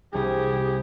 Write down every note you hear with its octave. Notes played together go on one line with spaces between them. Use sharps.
C2 G4 G#4